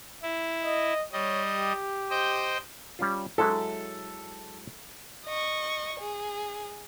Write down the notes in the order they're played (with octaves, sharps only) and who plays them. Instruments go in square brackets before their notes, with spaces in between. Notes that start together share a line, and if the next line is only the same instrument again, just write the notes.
[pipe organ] E4
[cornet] D#5
[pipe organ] G3 D#5 [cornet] C#5
[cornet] G4
[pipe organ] C5 D#5 G5
[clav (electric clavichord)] G3 C#4 F4
[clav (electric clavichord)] F#3 G#3 E4 [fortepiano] A4
[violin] D#5 C#6
G#4